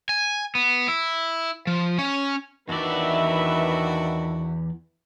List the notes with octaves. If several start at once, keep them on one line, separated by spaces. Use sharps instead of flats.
G#5
B3
E4
F3
C#4
E2 D#3 D4 E4 F#4 B4 D5 E5